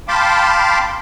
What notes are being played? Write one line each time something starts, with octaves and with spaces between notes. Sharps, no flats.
F5 G5 A5 B5 C6 D6